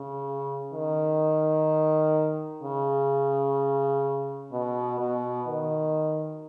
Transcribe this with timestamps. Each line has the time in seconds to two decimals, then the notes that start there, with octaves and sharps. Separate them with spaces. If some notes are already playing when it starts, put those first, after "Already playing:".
Already playing: C#3
0.73 D#3
2.63 C#3
4.52 B2
4.99 B2
5.47 D#3